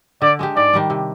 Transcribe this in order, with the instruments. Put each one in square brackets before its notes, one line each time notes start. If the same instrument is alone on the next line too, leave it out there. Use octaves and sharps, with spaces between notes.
[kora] D3 [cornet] D5
[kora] G#3 D4 G4
[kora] G#2 [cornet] D5
[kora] D#3 G3 D4
C3